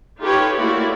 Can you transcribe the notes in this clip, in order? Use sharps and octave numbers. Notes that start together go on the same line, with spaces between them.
D#4 F4 G4 A4 B4 C#5
A3 A#3 E4 F#4 D5